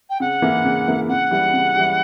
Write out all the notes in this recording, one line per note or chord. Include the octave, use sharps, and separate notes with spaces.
G5
C#3 F#5
E3 A#3 E4
C#3
E3 A#3 E4
C#3 F#5
E3 G3
C#3
E3 G3